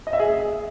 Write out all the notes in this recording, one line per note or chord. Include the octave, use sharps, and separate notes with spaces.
D#5
E5
G#4